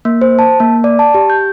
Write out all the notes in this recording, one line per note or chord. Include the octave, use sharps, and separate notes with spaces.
A#3
C5
A5
A#3
D5
A5
G4
G6